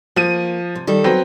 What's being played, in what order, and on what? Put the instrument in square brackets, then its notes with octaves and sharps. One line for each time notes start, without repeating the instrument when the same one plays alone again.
[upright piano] F3 D#7 [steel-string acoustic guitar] A#3
[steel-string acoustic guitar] C3
D#3 G3 A4
[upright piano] F#3 B3 C4